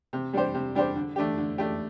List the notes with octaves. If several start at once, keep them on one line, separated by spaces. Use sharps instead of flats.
C3
G3 D4 G4 C5
C3
G3 D4 G4 C5
D3
A3 D4 G4
D3
A3 D4 G4